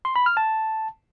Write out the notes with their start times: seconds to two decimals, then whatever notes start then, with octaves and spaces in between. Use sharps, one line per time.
0.05 C6
0.16 B5
0.26 F6
0.37 A5